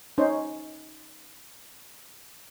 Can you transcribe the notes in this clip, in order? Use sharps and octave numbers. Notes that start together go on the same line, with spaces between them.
C#4 D#4 C5 C#5 D#5